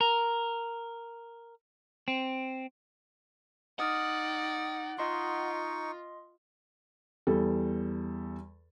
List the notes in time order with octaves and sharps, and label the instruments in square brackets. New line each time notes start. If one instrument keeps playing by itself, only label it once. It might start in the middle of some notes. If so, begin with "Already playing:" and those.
[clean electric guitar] A#4
C4
[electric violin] D#4 D5 [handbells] D#5 D#6 F6 [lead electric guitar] F#5
[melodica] D#4 C#6 [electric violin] F4 [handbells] D#5 C6
[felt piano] E2 G3 A4